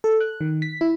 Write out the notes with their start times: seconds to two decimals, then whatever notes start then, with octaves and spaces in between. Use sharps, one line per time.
0.04 A4
0.20 F#6
0.41 D#3
0.62 B6
0.81 E4